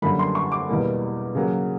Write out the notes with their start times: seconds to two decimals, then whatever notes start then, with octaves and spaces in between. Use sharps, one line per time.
0.02 F#2 D3 G3 A#3 B5
0.19 C6
0.35 C#6
0.52 D6
0.69 E2 B2 G3 A#3
1.35 C#3 F#3 A#3